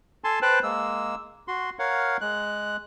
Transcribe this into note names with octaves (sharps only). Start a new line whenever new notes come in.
A4 G#5 A5 C6
B4 C5 G5 A5 F#6
G#3 A#3 E6
F#4 C6
A#4 C#5 F5 F#5
G#3 F#6